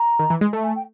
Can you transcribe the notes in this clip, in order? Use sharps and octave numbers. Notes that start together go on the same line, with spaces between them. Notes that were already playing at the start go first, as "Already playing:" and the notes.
Already playing: A#5
D#3
E3
G#3
A3 A5
G#5
G5